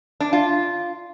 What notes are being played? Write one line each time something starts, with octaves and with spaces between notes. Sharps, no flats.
D4
F4